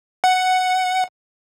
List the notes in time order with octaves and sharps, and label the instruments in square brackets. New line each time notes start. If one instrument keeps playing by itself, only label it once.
[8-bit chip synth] F#5